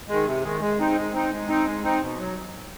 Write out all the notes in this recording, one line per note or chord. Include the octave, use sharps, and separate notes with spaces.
D#3 G#3
C3
D#3 G#3
G#3
C4 D#4
G#3
C4 D#4
G#3
C4 D#4
G#3
C4 D#4
B2
F#3